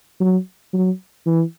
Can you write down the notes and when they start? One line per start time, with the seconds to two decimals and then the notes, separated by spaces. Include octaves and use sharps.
0.20 F#3
0.74 F#3
1.26 E3